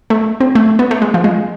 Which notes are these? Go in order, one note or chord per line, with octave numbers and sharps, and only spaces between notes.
A3
C4
A3
B3
A3
G#3
F3
G#3